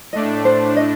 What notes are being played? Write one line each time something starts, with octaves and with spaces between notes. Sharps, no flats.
A2 A3 D4 D#5
C5
D#5